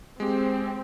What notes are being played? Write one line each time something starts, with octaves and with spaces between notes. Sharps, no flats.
G#3 C4 G4